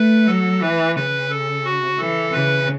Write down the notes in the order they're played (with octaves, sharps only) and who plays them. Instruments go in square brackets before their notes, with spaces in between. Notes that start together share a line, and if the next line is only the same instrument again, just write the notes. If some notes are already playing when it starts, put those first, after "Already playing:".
Already playing: [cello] A3 [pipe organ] B4
[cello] F#3 [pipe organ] A4
[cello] E3 [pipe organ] B4
[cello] C#3 [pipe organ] B4
[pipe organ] A4
F#4
[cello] E3 [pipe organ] A4
[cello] C#3 [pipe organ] B4